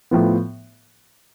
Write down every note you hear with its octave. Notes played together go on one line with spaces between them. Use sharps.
A2 F3 B3